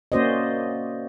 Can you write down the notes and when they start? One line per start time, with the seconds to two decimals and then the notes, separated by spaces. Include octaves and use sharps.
0.12 A#3 C#4 F#4 C5 D5 D#5